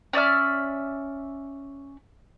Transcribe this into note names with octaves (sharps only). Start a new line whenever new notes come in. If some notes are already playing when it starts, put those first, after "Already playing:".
C#4 D5 E5 F6